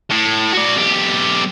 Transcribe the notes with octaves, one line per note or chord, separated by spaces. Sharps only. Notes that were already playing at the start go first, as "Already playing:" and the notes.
A2
F#4 D5
B1 G4